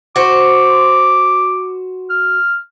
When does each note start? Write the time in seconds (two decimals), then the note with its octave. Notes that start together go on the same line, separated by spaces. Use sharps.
0.16 F#4 C5 D6
2.10 F6